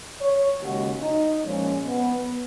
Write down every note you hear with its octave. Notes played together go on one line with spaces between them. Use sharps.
C#5
D#2 C#3 G#3 F#4
D#4
A#2 F3 G#3 C#4
B3